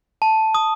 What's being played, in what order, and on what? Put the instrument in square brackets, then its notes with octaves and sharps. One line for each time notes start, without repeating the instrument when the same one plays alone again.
[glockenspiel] A5
D#6